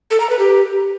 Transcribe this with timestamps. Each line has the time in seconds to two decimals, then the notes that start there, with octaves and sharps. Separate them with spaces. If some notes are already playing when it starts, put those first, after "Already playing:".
0.11 A4
0.20 A#5
0.30 B4
0.39 G4